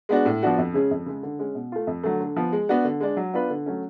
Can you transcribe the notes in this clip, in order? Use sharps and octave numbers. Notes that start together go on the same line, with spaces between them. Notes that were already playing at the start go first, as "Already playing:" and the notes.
G#3 B3 D4 F#4
A2
F3 B3 D4 F#4
F2
C#3 G#3 C#4 G#4
F2
C#3 G#3
D3
G#3 C#4
B2
A3 F4
F2
D3 F#3 A3
D3
F3 B3
G#3
B3 D4 F#4
D3
G#3 D4
F#3
B3 D4 F4 B4
D3
F#3 A3 C#4